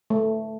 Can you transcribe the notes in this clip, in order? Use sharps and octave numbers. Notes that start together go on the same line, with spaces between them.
A3